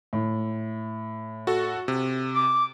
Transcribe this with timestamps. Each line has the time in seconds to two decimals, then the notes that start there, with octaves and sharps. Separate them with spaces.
0.13 A2
1.47 F#4 A4
1.88 C3
2.35 D6